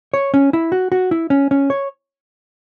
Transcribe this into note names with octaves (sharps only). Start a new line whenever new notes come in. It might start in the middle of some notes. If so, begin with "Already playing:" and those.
C#5
C#4
E4
F#4
F#4
E4
C#4
C#4
C#5